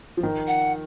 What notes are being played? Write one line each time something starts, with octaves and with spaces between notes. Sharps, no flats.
F3
D#3
F#5